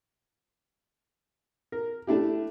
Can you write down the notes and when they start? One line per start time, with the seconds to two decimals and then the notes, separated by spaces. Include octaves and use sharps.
1.72 A#4
2.07 A3 D4 E4 G4